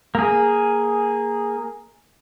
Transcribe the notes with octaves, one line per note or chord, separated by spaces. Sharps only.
A#3 G#4